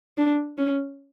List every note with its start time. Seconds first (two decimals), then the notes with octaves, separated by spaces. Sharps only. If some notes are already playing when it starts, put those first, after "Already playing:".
0.18 D4
0.58 C#4